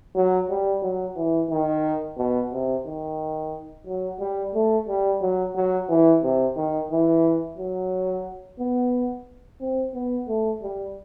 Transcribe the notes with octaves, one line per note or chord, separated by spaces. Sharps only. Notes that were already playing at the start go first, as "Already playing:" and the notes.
F#3
G3
F#3
E3
D#3
B2
C3
D#3
F#3
G3
A3
G3
F#3
F#3
E3
C3
D#3
E3
F#3
B3
C4
B3
A3
G3